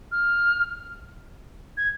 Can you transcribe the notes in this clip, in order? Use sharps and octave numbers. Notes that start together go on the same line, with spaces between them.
F6
G#6